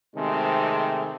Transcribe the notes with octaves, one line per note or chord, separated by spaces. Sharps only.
C3 D#3 G#3 A3 C4 G#4